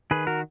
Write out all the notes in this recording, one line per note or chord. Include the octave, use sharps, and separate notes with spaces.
D#3 G#4 B4
F#4 A#4